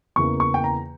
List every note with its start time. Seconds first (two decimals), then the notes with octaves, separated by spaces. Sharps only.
0.16 E2 C#3 E3 A#3 C#6
0.40 C#6
0.54 G5
0.64 A#5